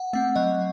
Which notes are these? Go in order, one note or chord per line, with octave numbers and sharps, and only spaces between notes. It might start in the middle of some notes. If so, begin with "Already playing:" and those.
Already playing: F#5
A3 C4 F#5
F#3 D#5